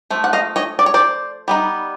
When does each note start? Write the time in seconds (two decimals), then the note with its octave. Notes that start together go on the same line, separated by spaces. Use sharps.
0.10 F3 A3
0.24 F#5
0.33 D#5 F5
0.56 C#5 D#5
0.79 D5
0.86 C#5
0.94 C5 D5
1.48 G3 B3 D#4